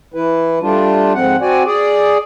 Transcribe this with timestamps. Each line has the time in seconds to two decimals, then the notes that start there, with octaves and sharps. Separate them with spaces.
0.14 E3 E4 B4
0.62 G3 A3 D4 F4
1.15 G#2 F3 C4 F#5
1.41 C4 F#4 D5 G#5
1.66 G#4 D5